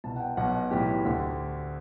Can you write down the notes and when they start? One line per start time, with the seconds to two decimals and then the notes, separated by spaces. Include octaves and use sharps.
0.04 C2 B2 A5
0.16 F#5
0.20 G5
0.37 B1 B2 F#5
0.71 B1 A2 E3 G4
1.05 D2 D3